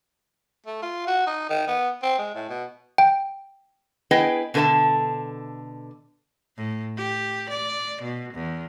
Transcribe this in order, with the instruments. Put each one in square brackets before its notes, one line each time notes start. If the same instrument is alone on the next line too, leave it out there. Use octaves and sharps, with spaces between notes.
[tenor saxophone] A3
F4
F#4
D#4
D#3
B3
C4
G#3
A2
B2
[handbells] G5
[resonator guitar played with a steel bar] B3 E4 G#4 B4 D#5 G5
B2 D3 A4 A#4 E5 A5
[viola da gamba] A2
G4
D5
B2
E2